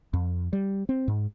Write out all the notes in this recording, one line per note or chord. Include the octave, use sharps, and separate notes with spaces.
F2
G3
C4
G#2